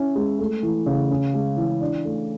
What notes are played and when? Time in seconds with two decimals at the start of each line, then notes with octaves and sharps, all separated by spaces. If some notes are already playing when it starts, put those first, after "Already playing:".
Already playing: C#4 E4
0.16 G#3
0.39 A3
0.63 E3
0.86 C#3
1.11 C#4
1.34 G#3
1.57 E3
1.81 D4
2.05 A3